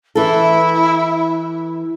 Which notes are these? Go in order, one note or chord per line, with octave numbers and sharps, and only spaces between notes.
E3 E4 A4